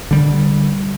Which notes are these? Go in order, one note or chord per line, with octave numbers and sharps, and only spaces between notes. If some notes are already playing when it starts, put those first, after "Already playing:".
D3 G3